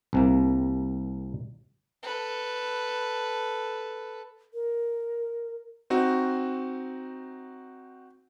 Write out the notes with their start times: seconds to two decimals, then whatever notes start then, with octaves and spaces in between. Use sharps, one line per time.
0.13 C2 C3 A#3
2.03 A4 B4
4.54 A#4
5.90 C4 D#4 F#4